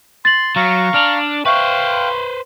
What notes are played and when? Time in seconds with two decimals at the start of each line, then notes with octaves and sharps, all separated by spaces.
0.25 C6 A6 F#7
0.56 F#3 F5 A#5 C#6
0.94 D4 F6 F7
1.46 B4 C5 E5 F5 G5 C#6 F#6